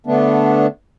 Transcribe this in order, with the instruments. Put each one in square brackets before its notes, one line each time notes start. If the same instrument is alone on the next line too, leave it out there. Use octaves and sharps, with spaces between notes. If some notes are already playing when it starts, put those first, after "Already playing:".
[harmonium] D3 A3 B3 D4